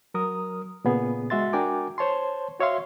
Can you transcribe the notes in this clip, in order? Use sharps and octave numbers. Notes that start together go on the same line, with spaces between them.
F#3 A#4 D#6
A#2 C#3 B3 G#4
G#3 F#4 E5 C6 A6
D4 F#4 A#4 G5 G#5 D6
C5 C#5 A5 C6
F#4 C#5 E5 F5 C6